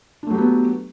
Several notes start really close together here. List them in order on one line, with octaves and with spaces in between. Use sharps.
D4 A3 F#3 G4 B3